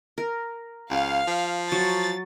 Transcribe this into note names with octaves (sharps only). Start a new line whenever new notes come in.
A#4
C#2 F5
F3
F#3 A6